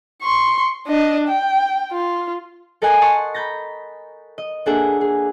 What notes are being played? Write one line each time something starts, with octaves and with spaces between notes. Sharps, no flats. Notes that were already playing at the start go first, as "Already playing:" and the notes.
C6 C#6
D4 D#5
G5
F4
A4 A#4 D#5 F#5 G#5
F#5 A5 C6 C#6 D#6
A#5 B5 G6 A6 A#6
D#5
A#3 D4 G#4 A4 E5 F#5
G#4